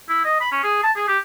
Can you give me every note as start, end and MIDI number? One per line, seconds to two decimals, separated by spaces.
0.09 0.20 64
0.25 0.37 75
0.41 0.50 83
0.52 0.63 61
0.63 0.79 68
0.83 0.91 81
0.96 1.03 68
1.08 1.18 67